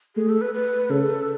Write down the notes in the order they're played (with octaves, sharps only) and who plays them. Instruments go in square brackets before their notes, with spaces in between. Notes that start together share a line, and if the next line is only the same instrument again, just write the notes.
[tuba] A3 [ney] G#4
[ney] A4
B4
B4
[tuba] C#3 [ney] A4